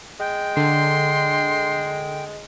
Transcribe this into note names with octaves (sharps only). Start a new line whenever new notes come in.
G#3 G5
D3 C6